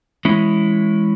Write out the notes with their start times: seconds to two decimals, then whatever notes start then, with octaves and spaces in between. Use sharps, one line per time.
0.25 E3 G#3 C#4 E4